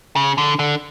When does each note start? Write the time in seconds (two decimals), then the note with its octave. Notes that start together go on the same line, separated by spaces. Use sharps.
0.16 C#3
0.38 D3
0.59 D3